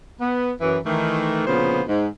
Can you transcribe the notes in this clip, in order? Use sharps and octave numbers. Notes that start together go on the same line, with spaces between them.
B3
F#2 E3
D#3 E3 A3
D2 A#2 C#3 F3 B3 C5
G#2